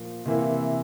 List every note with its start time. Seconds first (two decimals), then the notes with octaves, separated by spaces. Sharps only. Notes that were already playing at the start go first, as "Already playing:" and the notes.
Already playing: A#2 F3 A#3
0.26 C3 E3 A#3 E4